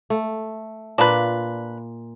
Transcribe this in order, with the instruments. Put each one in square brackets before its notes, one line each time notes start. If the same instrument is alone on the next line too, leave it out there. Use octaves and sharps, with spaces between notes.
[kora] A3
[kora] A#2 F4 [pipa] D4 B4